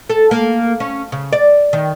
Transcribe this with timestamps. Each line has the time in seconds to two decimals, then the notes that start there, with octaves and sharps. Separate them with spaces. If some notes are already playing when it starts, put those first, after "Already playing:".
0.10 A4
0.31 A#3
0.80 C#4
1.12 C#3
1.33 D5
1.73 D#3